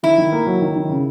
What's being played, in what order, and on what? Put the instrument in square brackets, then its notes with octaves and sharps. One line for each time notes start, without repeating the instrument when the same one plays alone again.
[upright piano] D#3 [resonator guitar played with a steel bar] E4
[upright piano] D#3
A#3
F#3
D#3
D#3
C#3